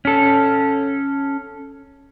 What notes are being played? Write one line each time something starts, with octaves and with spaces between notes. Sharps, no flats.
C#4 A4